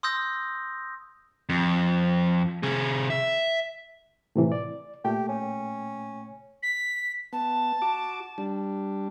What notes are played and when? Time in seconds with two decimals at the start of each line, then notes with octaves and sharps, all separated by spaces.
0.03 C6 D#6 E6 G6 A#6
1.49 F2
2.63 C3 G#4
3.10 E5
4.36 A2 C3 E3
4.52 D5
5.05 A#2 A3 G4 G5
5.29 C#4
6.63 B6
7.33 B3 A5
7.82 F#4 D6
8.38 G3 D4